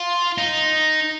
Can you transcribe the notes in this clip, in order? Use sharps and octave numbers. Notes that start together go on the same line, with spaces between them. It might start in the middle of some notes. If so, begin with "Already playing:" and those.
Already playing: F4
D#4